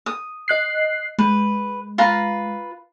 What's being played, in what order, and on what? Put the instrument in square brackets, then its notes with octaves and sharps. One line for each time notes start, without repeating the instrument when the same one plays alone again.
[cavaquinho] D#6
[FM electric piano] D#5 F#6 C7
[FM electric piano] G#3 [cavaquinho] B4
[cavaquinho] F4 B4 A#5